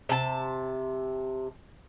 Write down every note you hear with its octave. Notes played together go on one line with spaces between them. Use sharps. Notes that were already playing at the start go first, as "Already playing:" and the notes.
C3 A5